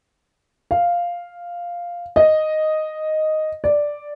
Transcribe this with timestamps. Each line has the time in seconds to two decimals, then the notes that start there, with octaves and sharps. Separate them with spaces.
0.71 F5
2.16 D#5
3.64 D5